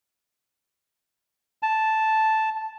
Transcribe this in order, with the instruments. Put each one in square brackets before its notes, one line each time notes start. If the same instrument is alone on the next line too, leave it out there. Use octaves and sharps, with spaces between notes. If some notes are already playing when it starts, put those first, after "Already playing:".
[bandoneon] A5